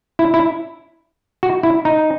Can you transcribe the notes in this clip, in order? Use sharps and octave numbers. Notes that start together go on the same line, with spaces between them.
E4
E4
F#4
E4
D#4